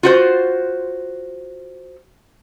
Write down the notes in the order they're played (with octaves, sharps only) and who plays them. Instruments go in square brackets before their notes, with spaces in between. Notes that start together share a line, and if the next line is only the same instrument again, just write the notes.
[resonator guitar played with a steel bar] F4 F#4 C5